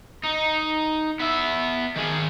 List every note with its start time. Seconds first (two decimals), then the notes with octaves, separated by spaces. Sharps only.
0.24 D#4
1.19 B3 E5
1.96 D#3 G#4